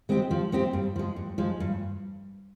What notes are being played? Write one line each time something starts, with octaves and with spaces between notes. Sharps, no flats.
G#3 C4 G4
F3
G#3 C4 G4
G2
F3 G#3
G2
F3 G#3
G2